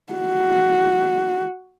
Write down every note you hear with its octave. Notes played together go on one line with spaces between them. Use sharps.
F#4